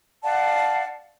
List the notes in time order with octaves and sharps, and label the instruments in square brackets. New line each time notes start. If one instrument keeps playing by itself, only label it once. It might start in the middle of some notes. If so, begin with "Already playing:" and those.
[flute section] D5 F5 F#5 A5